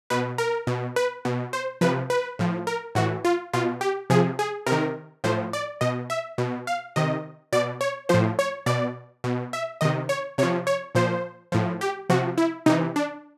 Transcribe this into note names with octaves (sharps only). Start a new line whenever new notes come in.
B2 B4
A#4
B2
B4
B2
C5
C3 F3 B4
B4
A2 F3
A#4
A2 E3 F#4
F4
B2 F4
G4
C3 F3 G#4
G#4
C3 A#4
D#3
A2 F3 C5
D5
B2 D#5
E5
B2
F5
C3 D#3 D#5
B2 D5
C#5
A2 F3 C5
C#5
B2 D5
B2
E5
C3 D#3 D#5
C#5
C3 F3 C#5
C#5
A#2 F3 C5
A2 F3
G4
C3 F3 F#4
E4
C3 E3 D#4
D4